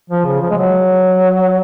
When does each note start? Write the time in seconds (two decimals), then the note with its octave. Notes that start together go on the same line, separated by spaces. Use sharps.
0.10 F3
0.25 C#3
0.41 F3
0.50 G#3
0.57 F#3